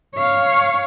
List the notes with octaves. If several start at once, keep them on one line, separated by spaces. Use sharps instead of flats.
C#5 F5